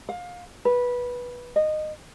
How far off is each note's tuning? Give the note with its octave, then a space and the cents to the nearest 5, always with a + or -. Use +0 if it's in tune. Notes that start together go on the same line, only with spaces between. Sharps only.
F5 +25
B4 -15
D#5 -15